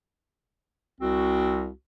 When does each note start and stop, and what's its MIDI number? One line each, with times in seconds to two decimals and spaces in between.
1.01 1.70 36
1.01 1.70 60
1.01 1.70 66